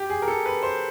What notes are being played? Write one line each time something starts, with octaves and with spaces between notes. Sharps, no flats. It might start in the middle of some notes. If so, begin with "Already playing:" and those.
Already playing: G4
G#4
A#4
A4
B4
C5